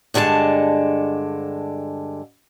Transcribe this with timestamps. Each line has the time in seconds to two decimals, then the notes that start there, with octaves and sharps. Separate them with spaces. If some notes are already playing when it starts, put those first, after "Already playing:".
0.14 G2 D3 G#3 A4 A5